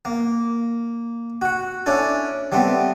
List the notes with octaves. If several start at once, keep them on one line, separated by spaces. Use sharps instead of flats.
A#3
F#4 F#5
C#4 D4 E4 A4
G3 A3 B3 C4